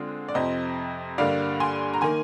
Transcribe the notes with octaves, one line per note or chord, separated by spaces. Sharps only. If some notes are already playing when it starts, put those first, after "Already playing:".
Already playing: D3 G#3 C4 F4 G#4
D5
F2 C3 F3 C5 D#5
G2 D3 G3 A#3 D5 F5
G#5 C6
A#5
D#3 A#3 G#5 C6